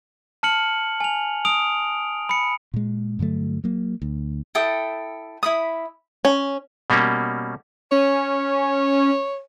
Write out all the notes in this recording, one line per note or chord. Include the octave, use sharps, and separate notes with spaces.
A5 F6 C#7 F#7
G#5 F7
D#6 D7 F7
B5 C#7
A#2 G#3
G2 D3 F#3 A3
F#3 A#3
D2
E4 A4 G5 D#6
E4 B5 D#6
C#4
B2 G3 A#3 C#4
C#4 C#5